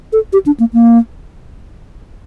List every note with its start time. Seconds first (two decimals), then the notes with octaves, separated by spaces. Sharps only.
0.13 A4
0.33 G4
0.46 D4
0.60 A#3
0.74 A#3